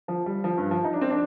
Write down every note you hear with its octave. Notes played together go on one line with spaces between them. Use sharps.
F3
G3
F3
G2
F3
D#4
D4
C4
D4